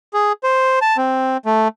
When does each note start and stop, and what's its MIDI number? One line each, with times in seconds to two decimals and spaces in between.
0.14 0.32 68
0.44 0.79 72
0.82 0.97 81
0.97 1.37 60
1.45 1.68 57